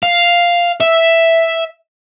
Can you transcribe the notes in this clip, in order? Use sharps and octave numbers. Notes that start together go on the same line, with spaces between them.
F5
E5